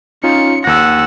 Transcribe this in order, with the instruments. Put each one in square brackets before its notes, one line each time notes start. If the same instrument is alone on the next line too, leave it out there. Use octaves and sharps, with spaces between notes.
[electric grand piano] C#4 D#4 F4 [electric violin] C#7
[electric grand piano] D#2 A#6 [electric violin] F#5 E6